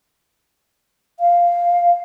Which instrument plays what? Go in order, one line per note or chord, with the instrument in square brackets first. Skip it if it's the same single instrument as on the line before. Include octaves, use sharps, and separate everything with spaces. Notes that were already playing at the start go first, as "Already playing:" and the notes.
[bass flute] F5